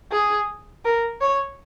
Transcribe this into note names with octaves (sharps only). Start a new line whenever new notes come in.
G#4
A#4
C#5